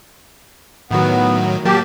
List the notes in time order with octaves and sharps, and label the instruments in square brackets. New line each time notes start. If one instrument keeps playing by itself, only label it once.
[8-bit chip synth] A2 D#3 F#3 [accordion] B3
[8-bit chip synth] F#3 A#3 A5 [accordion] G4